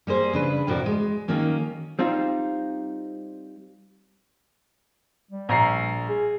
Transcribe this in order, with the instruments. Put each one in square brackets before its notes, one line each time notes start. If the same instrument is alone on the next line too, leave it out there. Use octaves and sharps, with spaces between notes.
[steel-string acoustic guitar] G3 A#3 G#4 C5
C#3 D4 B4
F2 A2 C3 F#4 A#4 D5
G#3
D#3 F#3 A#3 C#4
[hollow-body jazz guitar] G3 C4 D#4 F4
[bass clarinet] G3
[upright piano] A#1 A#5 C7
[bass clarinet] G#4